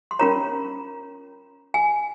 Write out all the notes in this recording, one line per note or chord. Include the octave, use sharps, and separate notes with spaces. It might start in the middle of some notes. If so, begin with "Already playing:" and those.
C6
C#4 F4 A#4 C#5 A#5
G#5